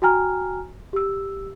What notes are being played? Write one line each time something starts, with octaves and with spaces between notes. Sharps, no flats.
F#4 G5 G#5 A#5 F6
G4 E6